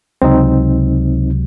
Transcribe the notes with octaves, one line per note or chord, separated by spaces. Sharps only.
C#2 C3 F#3 C4 D#4